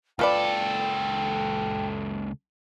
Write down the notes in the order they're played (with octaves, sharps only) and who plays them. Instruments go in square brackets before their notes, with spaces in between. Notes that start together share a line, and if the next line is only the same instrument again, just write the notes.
[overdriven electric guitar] C#2 A4 [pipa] F4 B4 D5 [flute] G5